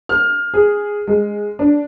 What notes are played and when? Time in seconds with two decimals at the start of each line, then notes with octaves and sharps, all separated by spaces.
0.09 F6
0.54 G#4
1.07 G#3
1.59 D4